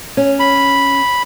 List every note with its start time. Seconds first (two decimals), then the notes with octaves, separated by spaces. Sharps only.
0.17 C#4
0.40 B5